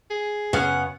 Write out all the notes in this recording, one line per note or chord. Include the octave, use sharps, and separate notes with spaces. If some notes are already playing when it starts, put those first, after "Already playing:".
G#4
F#2 C#3 B3 C#4 F5 F#5